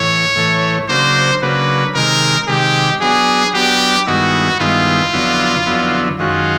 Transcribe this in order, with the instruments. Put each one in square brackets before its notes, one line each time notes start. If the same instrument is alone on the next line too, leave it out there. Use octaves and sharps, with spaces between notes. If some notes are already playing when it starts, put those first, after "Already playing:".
Already playing: [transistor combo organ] A2 E3 [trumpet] C#5
[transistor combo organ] A2 E3 A3
[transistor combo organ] C#3 F#3 A#3 D4 [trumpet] C5
[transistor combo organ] C#3 F#3 A#3 D4 [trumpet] B4
[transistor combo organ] C3 D#3 G#3 [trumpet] A#4
[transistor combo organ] C3 D#3 G#3 [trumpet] G4
[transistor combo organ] F#3 B3 D4 [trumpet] G#4
[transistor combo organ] F#3 B3 D4 [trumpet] G4
[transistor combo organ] G2 D#3 G#3 B3 E4 [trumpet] F#4
[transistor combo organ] G2 D#3 G#3 B3 E4 [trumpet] F4
[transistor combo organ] F2 D3 F#3 B3 E4
F2 D3 F#3 B3 E4
[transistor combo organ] F#2 D#3 G#3 C#4 F#4 [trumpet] F4